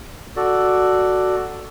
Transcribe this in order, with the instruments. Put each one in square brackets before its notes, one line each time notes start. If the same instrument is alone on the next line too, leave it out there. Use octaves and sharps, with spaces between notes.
[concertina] F#4 A4 D5